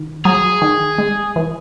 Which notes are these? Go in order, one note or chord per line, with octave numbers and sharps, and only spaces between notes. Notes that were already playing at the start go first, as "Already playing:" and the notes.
Already playing: D#3
F#3 G#4
D#3
G#3
E3